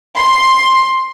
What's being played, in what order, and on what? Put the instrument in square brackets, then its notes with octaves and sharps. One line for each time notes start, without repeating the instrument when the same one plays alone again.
[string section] C6